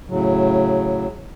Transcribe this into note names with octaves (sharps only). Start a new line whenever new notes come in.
A2 C#3 F#3